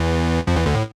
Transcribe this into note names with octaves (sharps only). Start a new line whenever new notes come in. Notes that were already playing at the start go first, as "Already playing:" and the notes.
Already playing: E2 E3
F2 F3
E2 E3
D2 D3
A2